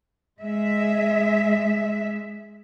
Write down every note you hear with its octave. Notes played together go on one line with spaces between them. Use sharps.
G#3 E5